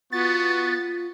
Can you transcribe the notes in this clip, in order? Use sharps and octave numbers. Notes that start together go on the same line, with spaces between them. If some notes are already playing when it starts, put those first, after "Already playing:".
B3 F4 F#4 A6